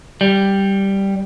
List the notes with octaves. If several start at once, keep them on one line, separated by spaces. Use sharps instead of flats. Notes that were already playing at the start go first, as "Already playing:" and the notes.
G3